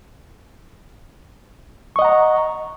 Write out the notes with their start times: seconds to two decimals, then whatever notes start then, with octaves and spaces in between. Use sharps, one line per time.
1.96 C#6
1.99 D#5
2.02 F#5
2.05 A#5